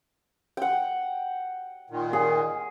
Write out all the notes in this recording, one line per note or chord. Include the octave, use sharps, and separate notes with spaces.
F#5 G5
A#2 D#3
G#4